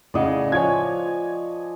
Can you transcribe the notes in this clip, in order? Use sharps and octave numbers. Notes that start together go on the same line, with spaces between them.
A2 C#3 D5 D#5 F#5
F3 C#5 G#5 G#6